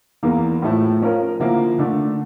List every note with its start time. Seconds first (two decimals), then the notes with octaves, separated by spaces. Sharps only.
0.23 E2 E3 A#3
0.62 A2 F3 A3 E4
1.01 F3 C#4 F4 A#4
1.39 D3 F3 A#3 E4
1.78 D3 A3 D4